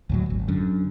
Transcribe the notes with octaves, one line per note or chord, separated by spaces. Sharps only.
D2 A2 F#3
G#1
F#2 D3